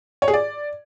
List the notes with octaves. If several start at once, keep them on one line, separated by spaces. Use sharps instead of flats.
C#5
G#4
D5